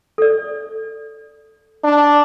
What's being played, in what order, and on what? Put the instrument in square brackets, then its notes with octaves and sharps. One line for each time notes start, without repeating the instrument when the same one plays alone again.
[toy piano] A4 D5
[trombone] D4